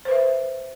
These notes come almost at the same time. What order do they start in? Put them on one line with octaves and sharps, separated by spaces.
C5 B4 E5